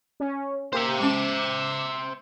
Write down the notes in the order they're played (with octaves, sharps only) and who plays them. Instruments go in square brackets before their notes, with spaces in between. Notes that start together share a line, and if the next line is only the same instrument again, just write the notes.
[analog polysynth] C#4
[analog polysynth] A#3 G4 [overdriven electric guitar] C5 E5
[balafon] G#3 C#4 [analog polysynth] D6 E7